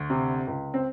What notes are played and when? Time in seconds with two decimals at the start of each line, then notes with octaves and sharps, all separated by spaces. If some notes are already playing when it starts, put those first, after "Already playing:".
Already playing: D2
0.10 C3
0.47 C#2
0.74 C4